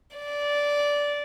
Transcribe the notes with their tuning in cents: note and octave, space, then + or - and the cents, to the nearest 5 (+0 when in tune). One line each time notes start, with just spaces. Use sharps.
D5 -15